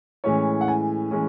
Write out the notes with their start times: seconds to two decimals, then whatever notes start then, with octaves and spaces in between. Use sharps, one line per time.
0.24 A2 E3 G#3 C#4 C#5
0.61 F#5
0.68 G#5
1.11 A2 E3 G#3 C#4